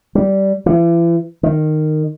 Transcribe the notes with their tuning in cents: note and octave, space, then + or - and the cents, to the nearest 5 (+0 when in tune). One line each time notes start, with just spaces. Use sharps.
G3 -15
E3 +40
D#3 -15